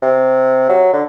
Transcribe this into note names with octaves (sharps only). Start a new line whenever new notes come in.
C3
F#3
D3